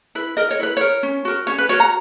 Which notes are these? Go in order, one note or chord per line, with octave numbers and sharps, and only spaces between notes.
E4 B4
A#4 D#5
C#5
E4 B4
A#4 C#5
C#4
F#4 A#4
C#4 C#5
B4
F#4 A#4 C#5
A#5